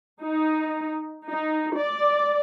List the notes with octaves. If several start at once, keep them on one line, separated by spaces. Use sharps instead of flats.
D#4
D#4
D5